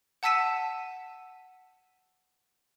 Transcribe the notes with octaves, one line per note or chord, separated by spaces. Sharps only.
F#5 A5 E6 B6 D#7 E7